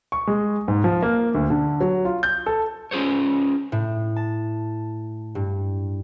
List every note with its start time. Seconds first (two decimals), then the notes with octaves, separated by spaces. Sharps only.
0.12 C#6
0.27 G#3
0.68 G#2
0.84 F3
1.02 A#3
1.34 D2
1.50 D3
1.80 F#3
2.05 F4
2.23 G6
2.46 A4
2.91 C#4 F4 G#4 C5 C#5
3.72 A2
4.16 A5
5.35 G2